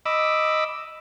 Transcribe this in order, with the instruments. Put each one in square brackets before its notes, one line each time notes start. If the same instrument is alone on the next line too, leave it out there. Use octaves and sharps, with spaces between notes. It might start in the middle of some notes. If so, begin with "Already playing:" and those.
[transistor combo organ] D#5 B5 D6 E6